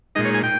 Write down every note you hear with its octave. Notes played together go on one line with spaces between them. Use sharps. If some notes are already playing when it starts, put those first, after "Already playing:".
A#2 G#3 D#4 D#5
C#5
G#5
G5